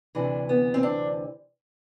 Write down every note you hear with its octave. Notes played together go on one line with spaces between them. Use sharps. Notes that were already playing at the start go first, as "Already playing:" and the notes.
D2 C3 E3 D4
B3
C4
D4